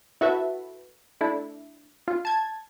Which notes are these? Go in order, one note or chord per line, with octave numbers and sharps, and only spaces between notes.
E4 F#4 A4 B4 E5
A3 D4 E4
F4
A5 G#6